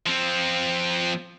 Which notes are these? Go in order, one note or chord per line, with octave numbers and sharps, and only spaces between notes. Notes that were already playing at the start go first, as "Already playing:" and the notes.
F3 C4